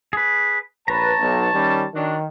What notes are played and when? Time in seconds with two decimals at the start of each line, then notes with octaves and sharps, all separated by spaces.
0.13 G#4 B4
0.88 A#1 B4 C#5 A5 A#5
1.19 B1
1.53 D#3 G3 C#4
1.94 D#3 F#3 D4